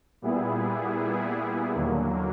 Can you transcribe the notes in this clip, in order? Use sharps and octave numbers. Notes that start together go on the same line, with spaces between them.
A#2 G3 B3 E4 G#4
D#2 D3 F#3 A#3